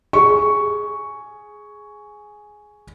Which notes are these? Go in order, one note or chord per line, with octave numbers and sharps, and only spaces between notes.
G#4 C#6